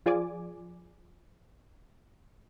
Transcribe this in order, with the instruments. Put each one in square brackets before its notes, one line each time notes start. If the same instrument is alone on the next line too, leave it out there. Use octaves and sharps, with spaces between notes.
[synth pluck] F3 F4 G#4 D5 G#5 D6